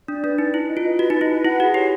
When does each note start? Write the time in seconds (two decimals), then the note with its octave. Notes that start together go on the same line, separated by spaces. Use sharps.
0.08 D4 D5
0.23 D4 B4
0.38 D#4 B4
0.54 E4 B4
0.69 D#5
0.77 F4
0.84 D#5
0.99 F#4 B4
1.10 D#4
1.14 B4
1.21 E4
1.29 B4
1.45 E4 F#5
1.59 F#4 G#4
1.74 G4 C#5